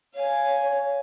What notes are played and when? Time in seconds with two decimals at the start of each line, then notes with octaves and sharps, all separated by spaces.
0.14 C#5 F5 G#5